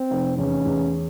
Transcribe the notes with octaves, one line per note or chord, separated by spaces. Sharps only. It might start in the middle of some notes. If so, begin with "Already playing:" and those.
Already playing: C4
F1
E2 C#4
E2